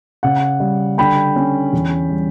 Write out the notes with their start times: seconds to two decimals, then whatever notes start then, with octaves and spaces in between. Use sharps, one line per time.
0.23 C#3 F#5
0.60 G3
0.98 D3 G5 B5
1.36 C#4
1.73 E2
2.10 G3